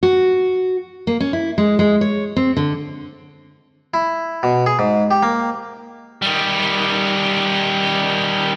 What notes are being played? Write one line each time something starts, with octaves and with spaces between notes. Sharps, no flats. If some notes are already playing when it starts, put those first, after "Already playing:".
F#4
A#3
C#4
E4
G#3
G#3
C#5
C4
D3
E4
B2
G#4
G#2
G4
A#3
D#3 G3